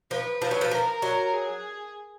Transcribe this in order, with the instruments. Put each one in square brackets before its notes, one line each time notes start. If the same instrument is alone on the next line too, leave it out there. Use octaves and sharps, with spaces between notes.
[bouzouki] F3 [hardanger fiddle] B4
[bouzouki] F3
F#3
F3
[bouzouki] F3 [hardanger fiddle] A#4
[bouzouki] F#3
[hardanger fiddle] G#4